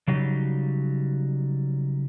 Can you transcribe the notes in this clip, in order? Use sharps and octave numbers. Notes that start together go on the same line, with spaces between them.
C#3 F#3 G3 D#4